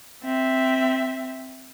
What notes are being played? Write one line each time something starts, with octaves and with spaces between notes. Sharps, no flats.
C4 E5